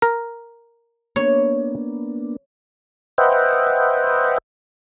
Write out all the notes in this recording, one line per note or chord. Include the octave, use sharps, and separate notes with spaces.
A#4
A#3 B3 D4 C#5
B4 C5 D#5 E5 F#5 G5